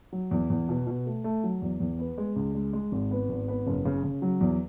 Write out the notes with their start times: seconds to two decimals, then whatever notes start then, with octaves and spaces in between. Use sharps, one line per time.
0.13 F#3
0.31 E2
0.50 E2
0.69 B2
0.87 B2
1.06 A3
1.24 A3
1.44 F#3
1.62 E2
1.80 E2
1.99 B3
2.18 G#3
2.36 C#2
2.55 G#3
2.73 G#3
2.92 G#1
3.11 B3
3.29 G#1
3.48 B3
3.67 F#1
3.85 C#3
4.04 C#3
4.22 F#3
4.41 E2